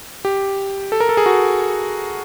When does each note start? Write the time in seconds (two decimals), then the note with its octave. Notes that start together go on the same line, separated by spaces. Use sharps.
0.25 G4
0.92 A4
1.00 A#4
1.09 A4
1.17 G#4
1.26 F#4